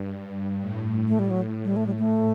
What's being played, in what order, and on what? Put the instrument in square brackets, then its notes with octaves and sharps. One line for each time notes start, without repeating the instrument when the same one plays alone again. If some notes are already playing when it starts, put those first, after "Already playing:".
Already playing: [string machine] G2
A2
[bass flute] A3
G3
F#3
G3
A3
G3
A3